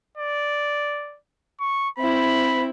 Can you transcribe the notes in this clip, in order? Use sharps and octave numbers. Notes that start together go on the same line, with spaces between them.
D5
C#6
C4 E4 B5